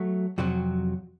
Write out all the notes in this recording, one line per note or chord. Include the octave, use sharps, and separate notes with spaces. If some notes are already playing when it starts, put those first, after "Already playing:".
Already playing: F#3 A3
F2 C3 F#3 F#4